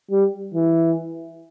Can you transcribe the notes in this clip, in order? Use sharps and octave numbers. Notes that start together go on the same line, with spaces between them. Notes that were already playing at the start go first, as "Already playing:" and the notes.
G3
E3